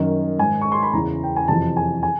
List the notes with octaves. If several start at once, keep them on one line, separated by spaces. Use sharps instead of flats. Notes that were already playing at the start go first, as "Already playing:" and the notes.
Already playing: F#2 D#3
G#2 D#3 G#5
C#6
C6
B5
E2 C#3 E3 A#5
G5
G#5
F2 C3 E3 A5
G#5
G#5